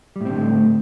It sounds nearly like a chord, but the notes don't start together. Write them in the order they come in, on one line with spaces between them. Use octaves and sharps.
G3 A2 C4 D3 A3